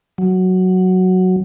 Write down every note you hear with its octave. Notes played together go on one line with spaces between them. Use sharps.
F#3